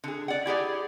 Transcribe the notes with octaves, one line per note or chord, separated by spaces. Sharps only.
D3 G#4
D5 F#5
E4 G4 G#4 D5